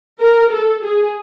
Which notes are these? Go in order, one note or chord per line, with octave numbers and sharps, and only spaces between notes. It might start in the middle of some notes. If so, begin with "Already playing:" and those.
A#4
A4
G#4